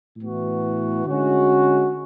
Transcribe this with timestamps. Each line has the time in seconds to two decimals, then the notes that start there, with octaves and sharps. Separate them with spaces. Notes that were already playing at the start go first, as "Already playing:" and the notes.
0.17 A2 E3 B3 F#4
1.05 D3 G#3 C#4 F#4